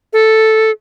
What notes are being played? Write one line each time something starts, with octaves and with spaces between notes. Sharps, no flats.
A4